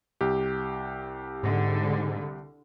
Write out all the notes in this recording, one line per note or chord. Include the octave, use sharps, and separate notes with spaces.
C2 G4
G#2 D3